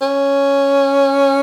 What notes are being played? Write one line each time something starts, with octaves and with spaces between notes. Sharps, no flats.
C#4